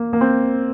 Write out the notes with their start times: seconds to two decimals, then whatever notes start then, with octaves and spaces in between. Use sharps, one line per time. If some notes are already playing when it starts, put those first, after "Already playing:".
Already playing: A#3
0.13 A#3
0.21 C4